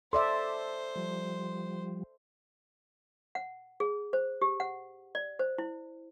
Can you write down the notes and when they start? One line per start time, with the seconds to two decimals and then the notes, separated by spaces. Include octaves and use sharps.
0.13 A4 C5 D5 E5 C6
0.96 F3 G3
3.35 F#5
3.80 G#4
4.13 C5
4.42 G4
4.60 F#5
5.15 D5
5.39 C5
5.58 E4